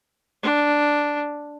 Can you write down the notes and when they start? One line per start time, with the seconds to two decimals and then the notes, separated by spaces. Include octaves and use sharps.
0.43 D4